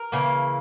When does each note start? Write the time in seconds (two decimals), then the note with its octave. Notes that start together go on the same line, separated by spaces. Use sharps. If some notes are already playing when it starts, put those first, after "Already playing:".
Already playing: A#4
0.12 C#3 E3 A#3